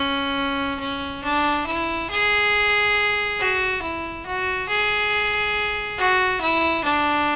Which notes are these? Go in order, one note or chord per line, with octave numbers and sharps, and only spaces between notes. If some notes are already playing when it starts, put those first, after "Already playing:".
Already playing: C#4
C#4
D4
E4
G#4
F#4
E4
F#4
G#4
F#4
E4
D4